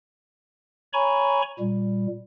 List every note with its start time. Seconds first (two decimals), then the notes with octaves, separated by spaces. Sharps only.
0.93 C#5 G#5 A#5 B5 C#6
1.59 A#2 G3